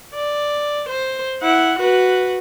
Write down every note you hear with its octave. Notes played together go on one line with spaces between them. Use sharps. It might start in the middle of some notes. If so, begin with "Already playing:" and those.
D5
C5
E4 F#5
F#4 B4